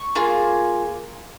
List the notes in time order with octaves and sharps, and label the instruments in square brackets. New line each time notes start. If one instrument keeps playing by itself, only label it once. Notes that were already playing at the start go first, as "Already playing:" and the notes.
Already playing: [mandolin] C#6
A#3 F4 G#4